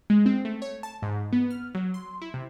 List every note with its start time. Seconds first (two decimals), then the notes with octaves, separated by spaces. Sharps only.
0.10 G#3
0.26 C4
0.45 A3
0.62 C#5
0.83 A5
1.02 G#2
1.33 B3
1.50 F6
1.75 F#3
1.94 C6
2.22 E4
2.34 C3